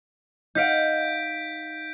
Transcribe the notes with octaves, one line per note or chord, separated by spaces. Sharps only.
D#4 F5 F#5 G6 B6 D7